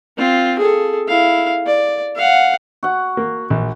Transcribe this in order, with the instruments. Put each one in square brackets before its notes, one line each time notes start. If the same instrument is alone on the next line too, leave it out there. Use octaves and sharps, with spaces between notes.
[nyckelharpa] C4 F4
G#4 A4
E4 F5
D5
F5 F#5
[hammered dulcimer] F#4 F#5
[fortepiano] A#3
A#1